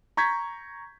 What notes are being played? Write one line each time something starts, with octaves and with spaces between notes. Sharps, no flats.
A#5 C#6 G6 G#6 B6